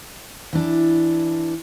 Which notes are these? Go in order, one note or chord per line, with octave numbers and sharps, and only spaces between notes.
E3 D4